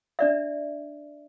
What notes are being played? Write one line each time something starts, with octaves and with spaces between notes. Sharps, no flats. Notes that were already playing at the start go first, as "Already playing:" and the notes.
D4 D5 E5